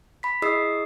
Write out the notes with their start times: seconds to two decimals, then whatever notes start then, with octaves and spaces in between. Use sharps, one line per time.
0.23 B5 B6
0.42 E4 G#4 D#5 D#6 E6 C7